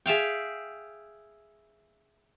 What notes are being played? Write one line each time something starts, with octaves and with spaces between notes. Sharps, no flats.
G#4 E5 F5 G5